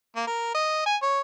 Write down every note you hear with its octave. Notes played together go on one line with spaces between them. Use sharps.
A#3
A#4
D#5
G#5
C#5